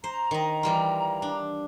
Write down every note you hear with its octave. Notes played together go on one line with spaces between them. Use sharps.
C5 A#5
D#3 D#5
E3 G3 F4
D4